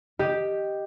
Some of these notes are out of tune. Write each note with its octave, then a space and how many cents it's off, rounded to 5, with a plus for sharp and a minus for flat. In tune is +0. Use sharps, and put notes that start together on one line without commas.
G4 +0 D#5 +0